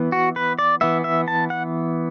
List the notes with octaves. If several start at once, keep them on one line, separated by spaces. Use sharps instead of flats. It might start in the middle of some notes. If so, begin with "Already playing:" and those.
Already playing: E3 B3
F#4
B4
D5
E3 B3 E5
E5
A5
F#5